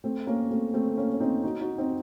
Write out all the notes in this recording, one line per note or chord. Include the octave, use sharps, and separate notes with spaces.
A3 C4
A#3 C#4
A3 C4
A3 C4
A#3 C#4
C#4
C4 D#4
D#4 F#4
D#4 F#4
C4 D#4